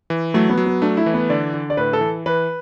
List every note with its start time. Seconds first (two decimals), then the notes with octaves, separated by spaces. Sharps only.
0.10 E3
0.34 F#3 A3
0.50 B3
0.58 F#3
0.66 B3
0.82 A3 D4
0.97 E4
1.06 E3
1.14 B3
1.30 D3 D5
1.54 D3
1.70 D5
1.77 A2 B4
1.93 A4
2.01 E3
2.26 E3 B4